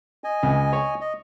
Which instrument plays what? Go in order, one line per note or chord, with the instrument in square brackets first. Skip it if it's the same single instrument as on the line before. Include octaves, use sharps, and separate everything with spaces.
[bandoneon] D#5 G#5
[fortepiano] C#2
C#5
[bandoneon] D#5